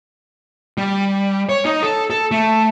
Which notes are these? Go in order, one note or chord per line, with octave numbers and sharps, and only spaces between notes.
G3
C#5
D#4
A4
A4
A3